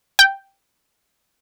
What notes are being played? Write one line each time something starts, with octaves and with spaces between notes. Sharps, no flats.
G5